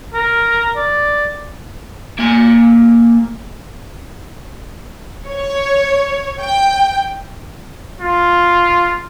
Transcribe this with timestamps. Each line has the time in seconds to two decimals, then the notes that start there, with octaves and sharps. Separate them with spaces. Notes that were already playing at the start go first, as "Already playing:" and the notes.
0.14 A#4
0.76 D5
2.19 A#3 G#5
5.28 C#5
6.40 G5
8.01 F4